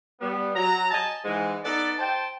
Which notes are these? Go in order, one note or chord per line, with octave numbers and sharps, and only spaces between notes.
G3 B3
F#3 A#5
D#5 G#5 A5
G#2 E3 G#3
B3 D#4 A4 D5
C5 G5 A5